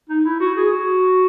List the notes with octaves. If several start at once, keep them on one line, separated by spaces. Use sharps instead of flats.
D#4
E4
F#4
G#4
F#4